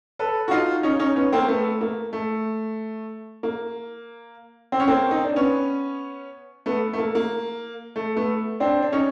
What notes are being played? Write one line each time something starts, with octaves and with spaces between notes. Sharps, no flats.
A4 B4
F#4
D#4 F4
C#4 D#4
C#4 D#4
B3 C#4
A#3 C4
A3 B3
A#3
A3
A#3
C4
C#4
A#3 C4
D#4
D4
B3 C#4
A3 B3
A3
A#3
A#3
A3
A3 B3
C4 D4
D4
C#4 D#4